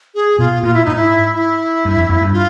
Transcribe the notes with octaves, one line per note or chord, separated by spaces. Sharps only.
G#4
B2 F4
A#2 F4
E4
G#2 D#4
E4
E4
G2
F2
F2
G2
F4